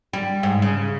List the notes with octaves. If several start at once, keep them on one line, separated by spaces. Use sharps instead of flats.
G3
G#2
C#3